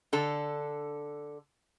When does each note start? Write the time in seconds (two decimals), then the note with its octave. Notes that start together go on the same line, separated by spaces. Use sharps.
0.13 D3 A4